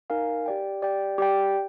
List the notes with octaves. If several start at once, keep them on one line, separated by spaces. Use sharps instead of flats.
D#4 A#4 F5 G#5
G4 D5 G5
G4 D5 G5
G4 D5 G5